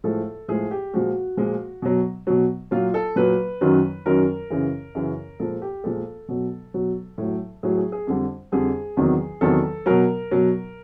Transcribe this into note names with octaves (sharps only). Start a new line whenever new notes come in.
A2 F3 G#3 A4
A2 F3 G#3 G#4
G4
A#2 F3 G#3 F#4
A#2 F3 G#3
B2 F#3
B2 F#3
A#2 F#3 F4
A4
A#2 F#3 B4
F#2 D#3 F#3
F#2 D#3 F#3 A#4
F#2 C#3 E3
F#2 C#3 E3
A#2 F3 G#3 A4
G4
A#2 F3 G#3 A4
B2 F#3
B2 F#3
A2 F#3
A2 F#3 G#4
G#4
G#4
F2 D3 G3
F2 D3 G3 G#4
E2 C3 D#3 F#3
E2 C3 D#3 F#3 A4
B2 F#3 A#4
B2 F#3